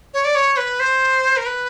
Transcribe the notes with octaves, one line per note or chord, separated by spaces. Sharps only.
C#5
D5
C#5
B4
C5
A#4
B4